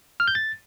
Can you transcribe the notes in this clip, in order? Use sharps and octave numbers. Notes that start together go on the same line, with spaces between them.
F6
G6
A6